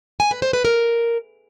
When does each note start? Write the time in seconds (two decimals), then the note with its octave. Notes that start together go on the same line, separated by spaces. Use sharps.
0.20 G#5
0.31 B4
0.42 C5
0.53 B4
0.65 A#4